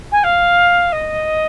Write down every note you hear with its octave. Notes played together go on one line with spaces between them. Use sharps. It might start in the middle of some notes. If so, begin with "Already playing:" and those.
G#5
F5
D#5